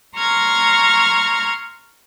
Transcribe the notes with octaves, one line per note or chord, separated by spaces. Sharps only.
A#5 C6 C#6 F6 G#6 A#6